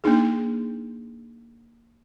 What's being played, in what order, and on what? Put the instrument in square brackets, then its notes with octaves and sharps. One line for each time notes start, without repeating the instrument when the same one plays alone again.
[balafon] A#3 D4 D#4 G#4